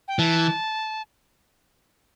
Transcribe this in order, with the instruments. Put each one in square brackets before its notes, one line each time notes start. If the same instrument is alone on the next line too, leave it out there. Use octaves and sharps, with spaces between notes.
[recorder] G5
[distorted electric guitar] E3 [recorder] A5